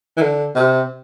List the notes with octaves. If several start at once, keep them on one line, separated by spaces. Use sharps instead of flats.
E3
D3
C3